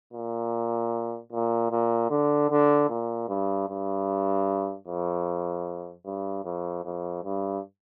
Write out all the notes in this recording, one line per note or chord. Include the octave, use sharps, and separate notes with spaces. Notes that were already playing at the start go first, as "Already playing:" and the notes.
A#2
A#2
A#2
D3
D3
A#2
G2
G2
F2
G2
F2
F2
G2